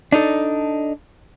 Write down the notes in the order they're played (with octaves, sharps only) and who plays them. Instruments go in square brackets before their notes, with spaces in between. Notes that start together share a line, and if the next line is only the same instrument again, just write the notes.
[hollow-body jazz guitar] D4 D#4 A4